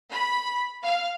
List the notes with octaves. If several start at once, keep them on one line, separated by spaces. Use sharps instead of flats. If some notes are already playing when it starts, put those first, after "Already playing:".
B5
F5